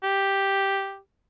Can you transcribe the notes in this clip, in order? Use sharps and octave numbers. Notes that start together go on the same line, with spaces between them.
G4